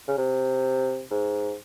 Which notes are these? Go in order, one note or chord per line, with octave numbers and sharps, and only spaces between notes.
C#3
C3
G#2